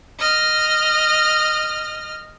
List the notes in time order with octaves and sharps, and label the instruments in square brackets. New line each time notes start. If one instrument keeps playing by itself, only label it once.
[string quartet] D#5 F6